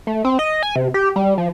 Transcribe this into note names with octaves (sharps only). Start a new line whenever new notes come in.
A3
C4
D#5
G#5
C3
G4
G3
F3